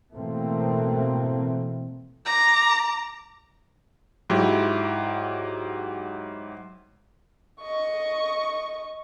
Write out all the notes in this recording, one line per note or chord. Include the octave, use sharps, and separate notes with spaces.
B2 E3 A3 A#3 C4
A#5 D6
G#2 F#3 E4 G4
D#5 C#6